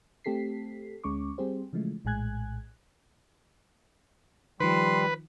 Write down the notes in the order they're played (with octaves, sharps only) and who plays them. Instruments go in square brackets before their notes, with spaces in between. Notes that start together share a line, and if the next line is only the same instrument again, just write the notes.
[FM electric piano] A3 C4 G4 A4 B6 C7
D2 G#3 C#4 C#6 D6
G3 C4 G4 G#4 C5
C#3 E3 F3 G#3 A3
A#1 A2 G#3 G#5 F#6 G#6
[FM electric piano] D#3 F3 [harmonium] G3 [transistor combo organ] B4 [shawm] C6